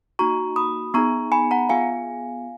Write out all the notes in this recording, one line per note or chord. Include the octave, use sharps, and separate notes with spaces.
A#3 D#4 F#4 A#5 C#6
B5 D#6
B3 D#4 G#4 A#5 C#6
G#5 B5
F#5 A#5
B3 F4 G#4 F5 G#5